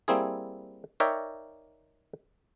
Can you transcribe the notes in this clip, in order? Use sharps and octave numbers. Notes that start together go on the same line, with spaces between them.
G3 A#3 C4 E4 G#4
D#4 A#4 C#5 D5 E5 G5